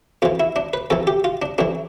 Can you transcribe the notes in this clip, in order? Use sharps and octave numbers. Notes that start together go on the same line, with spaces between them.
F2 E3 F4
E4
D4
B4
F2 E3 A4
G4
F4
D4
F2 E3 D4